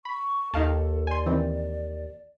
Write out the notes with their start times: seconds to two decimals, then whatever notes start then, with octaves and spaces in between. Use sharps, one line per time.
0.05 B5 C#6
0.54 D#2 D#4 A4 F5 A5
1.07 D5 G#5 C6
1.26 D#3 E3 C4